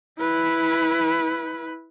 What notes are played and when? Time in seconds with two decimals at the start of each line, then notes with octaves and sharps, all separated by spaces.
0.18 E4 B4